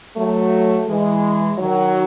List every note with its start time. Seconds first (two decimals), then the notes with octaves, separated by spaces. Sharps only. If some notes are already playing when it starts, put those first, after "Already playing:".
0.16 F#3 A3
0.87 E3 G#3
1.58 D#3 F#3